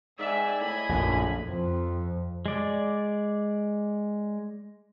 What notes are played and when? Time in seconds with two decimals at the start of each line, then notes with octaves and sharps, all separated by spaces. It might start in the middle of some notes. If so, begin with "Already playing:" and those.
0.19 G#2 D5 E5 G5 G#5 E6
0.60 A2 D#5 G#5 B5
0.89 A#1 F#2
1.47 F2
2.46 G#3 D5